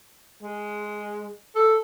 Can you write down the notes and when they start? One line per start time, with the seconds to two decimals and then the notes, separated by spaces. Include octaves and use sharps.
0.43 G#3
1.55 A4